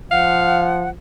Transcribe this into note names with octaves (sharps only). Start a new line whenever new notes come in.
F3 F5 F#5